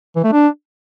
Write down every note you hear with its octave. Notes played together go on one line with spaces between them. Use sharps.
E3
A3
D4